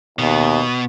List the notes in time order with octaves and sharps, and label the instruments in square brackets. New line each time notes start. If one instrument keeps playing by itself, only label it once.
[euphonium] D#2 [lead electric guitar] B2